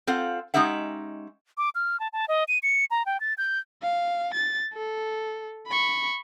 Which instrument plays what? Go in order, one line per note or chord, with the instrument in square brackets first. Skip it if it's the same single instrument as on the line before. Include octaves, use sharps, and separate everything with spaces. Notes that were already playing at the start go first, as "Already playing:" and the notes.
[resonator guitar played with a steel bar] C4 F4 A4 F5 F#5
G#3 C#4 D#4 G4 E5 F#5
[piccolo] D6
F6
A5
A5
D#5
D#7
C#7
A#5
G5
A6
G6
[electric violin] F5
A6
A4
B5 C#6